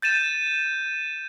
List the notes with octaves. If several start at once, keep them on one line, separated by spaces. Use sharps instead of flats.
G6 A6 D#7 E7